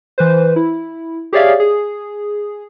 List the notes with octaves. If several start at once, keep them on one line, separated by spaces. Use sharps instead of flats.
E3 B4 C5
E4
G4 G#4 C#5 D5 E5 F5
G#4